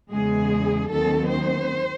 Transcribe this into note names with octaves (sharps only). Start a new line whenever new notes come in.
E2 C#3 G#3 G#4
D#2 D#3 F#3 C4 A4
C5